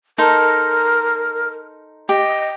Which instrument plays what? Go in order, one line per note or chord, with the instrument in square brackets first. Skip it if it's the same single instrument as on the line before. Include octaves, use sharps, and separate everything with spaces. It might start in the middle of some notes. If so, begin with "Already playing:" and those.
[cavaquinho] D#4 A4 C5 [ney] A#4
[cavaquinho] G4 [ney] D#5